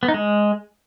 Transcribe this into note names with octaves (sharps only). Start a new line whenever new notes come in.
B3
D#4
G#3